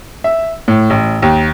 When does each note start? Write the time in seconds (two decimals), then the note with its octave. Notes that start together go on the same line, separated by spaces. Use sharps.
0.24 E5
0.68 A2
0.90 A1
1.22 D#2